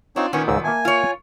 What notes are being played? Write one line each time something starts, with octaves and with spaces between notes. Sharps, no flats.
C4 D4 D#4 F4 C#5
A#2 D#3 B3 C#4 C#5
C#2 G#2 E6
A#3 E5 G#5 A5
F4 C#5